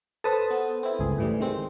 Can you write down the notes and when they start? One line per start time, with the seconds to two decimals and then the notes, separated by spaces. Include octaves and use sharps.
0.24 A4 B4 C5 A5 D#6
0.51 B3
0.83 C4 E4
0.99 G1 C#2 G#4
1.18 A2 E3 G3
1.40 D#3 G#3 C4